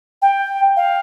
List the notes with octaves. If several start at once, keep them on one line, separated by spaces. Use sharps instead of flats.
G5
F5